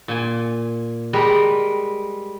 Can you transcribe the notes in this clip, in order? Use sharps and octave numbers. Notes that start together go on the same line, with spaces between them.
A#2 G#5
G3 G#3 A#4 B4